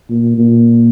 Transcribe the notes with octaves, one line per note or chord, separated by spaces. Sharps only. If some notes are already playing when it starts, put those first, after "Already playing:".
A#2
A#2